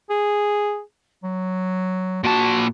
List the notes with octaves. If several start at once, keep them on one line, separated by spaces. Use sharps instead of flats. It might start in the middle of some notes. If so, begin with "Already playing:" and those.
G#4
F#3
A#2 F#4 A5